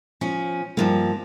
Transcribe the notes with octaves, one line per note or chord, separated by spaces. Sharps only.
F3 C#4
G2 F3 A#3